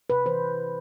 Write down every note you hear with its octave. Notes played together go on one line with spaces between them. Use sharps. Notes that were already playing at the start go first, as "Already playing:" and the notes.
C3 B4
E3 C5